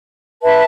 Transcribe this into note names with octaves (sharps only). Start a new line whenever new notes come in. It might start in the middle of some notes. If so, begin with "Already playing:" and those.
B4 E5 A5